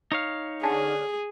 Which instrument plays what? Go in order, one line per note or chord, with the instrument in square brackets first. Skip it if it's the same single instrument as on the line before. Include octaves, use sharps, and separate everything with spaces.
[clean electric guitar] D#4 C#5 F5
[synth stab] D3 C#4 D4 [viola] G#4